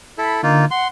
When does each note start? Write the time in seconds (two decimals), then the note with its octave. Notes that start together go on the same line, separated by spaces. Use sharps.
0.18 E4 A4 B5
0.43 D3 A#3 D#4 F4
0.71 F#5 C6